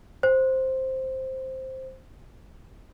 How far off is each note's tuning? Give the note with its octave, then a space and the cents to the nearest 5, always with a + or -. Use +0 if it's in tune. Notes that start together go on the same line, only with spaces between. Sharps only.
C5 +5